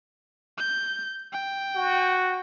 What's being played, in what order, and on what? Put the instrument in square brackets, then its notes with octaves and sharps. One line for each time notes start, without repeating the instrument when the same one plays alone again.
[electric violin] G6
G5
[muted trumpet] F#4